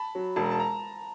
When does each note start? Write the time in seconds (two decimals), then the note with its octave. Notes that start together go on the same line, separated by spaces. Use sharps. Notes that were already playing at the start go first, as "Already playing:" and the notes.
Already playing: A5 B5
0.15 F#3
0.36 E1 A5
0.44 A#5
0.51 A5
0.60 A#5